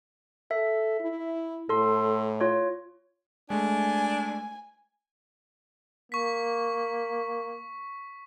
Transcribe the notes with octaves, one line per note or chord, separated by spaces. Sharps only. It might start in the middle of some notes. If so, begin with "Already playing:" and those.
A4 E5
E4
A2 A4 C6
F4 C#5
G#3 A3 D4 G#5
A#3 C#6 B6